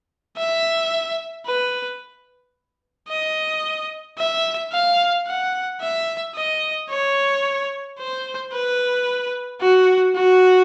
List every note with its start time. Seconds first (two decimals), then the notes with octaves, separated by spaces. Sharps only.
0.37 E5
1.46 B4
3.09 D#5
4.18 E5
4.72 F5
5.27 F#5
5.81 E5
6.35 D#5
6.89 C#5
7.98 C5
8.53 B4
9.61 F#4
10.15 F#4